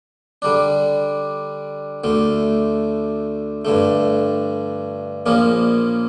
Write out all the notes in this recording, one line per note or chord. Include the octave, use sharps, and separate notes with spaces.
D3 G3 D4
D2 D3 A3
G2 D3 A3
A#1 A#2 F3 A#3 C#4